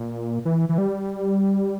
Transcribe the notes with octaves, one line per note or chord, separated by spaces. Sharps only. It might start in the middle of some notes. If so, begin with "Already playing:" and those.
Already playing: A#2
E3
E3
G3